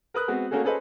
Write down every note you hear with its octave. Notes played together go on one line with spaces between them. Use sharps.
A#4 B4 D#6 F#6
G#3 B3 C4 F#4
A3 A#3 C#4 F#4 G#4 A4
C#4 G#4 A4 B4 C5 D#5